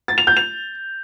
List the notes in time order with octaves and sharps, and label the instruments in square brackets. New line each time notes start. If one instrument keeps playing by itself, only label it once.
[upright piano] A6
F7
G6
F7